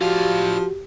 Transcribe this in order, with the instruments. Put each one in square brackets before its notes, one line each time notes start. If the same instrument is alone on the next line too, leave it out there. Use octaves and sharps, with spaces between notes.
[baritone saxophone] F3 [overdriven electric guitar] D4 F5 [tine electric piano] F#4 [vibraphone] G4